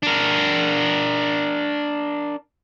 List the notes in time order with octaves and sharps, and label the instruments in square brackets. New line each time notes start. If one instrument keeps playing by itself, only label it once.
[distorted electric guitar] D4 A#4